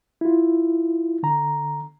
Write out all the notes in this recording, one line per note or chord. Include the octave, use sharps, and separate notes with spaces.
E4 F4
D3 A#5